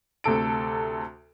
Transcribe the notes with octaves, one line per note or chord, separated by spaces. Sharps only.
D2 C3 A4 D7